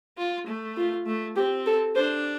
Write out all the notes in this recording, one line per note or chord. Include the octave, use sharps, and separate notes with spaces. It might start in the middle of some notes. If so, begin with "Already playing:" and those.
F4
A3
F4
A3
C4 G4
A4
D4 C5